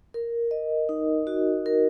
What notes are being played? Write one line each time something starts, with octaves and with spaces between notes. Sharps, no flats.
A#4
D#5
D#4
F#4
A#4